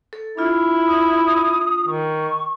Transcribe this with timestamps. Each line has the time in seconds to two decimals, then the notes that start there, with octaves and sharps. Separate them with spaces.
0.13 A4
0.37 D4 E4 F4
0.87 D#6
1.87 D#3 C#6